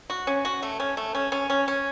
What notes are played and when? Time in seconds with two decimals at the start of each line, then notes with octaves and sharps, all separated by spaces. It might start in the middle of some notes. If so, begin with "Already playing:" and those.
0.10 F#4
0.27 C#4
0.45 F#4
0.62 A3
0.80 C#4
0.97 A3
1.15 C#4
1.32 C#4
1.50 C#4
1.68 C#4